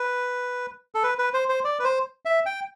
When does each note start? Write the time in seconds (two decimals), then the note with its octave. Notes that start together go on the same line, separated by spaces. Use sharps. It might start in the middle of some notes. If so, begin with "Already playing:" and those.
Already playing: B4
0.95 A4
1.03 B4
1.19 B4
1.34 C5
1.49 C5
1.64 D5
1.79 B4
1.84 C5
2.25 E5
2.46 G5